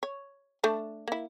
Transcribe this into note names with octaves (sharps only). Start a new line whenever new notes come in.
C#5
A3 D4 A5
A#3 E4